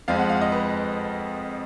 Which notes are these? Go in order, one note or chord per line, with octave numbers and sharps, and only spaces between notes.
F2 F3 G#3 F5
F#5
F5
D#5
B4